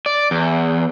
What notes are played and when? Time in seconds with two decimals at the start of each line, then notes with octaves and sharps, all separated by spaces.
0.06 D5
0.31 E2